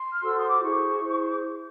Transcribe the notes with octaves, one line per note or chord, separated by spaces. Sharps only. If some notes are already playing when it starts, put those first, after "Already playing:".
Already playing: C6
F6
F#4 A4 C5 E6
D#6
D6
E4 G#4 C5 C#6
E4 G#4 C5